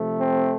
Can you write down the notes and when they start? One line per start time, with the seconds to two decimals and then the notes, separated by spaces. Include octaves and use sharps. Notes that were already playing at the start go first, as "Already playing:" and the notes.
Already playing: C3 F3 A3
0.19 C4